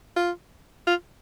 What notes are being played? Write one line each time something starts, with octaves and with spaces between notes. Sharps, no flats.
F4
F4